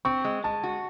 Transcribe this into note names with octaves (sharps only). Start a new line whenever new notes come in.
C4 C#6
G#3
G#3 A5
F#4